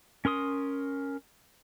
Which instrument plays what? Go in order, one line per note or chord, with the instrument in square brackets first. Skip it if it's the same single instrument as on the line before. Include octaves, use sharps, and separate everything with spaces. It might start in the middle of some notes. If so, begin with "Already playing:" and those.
[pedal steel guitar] C#4 A#4 C6 D#6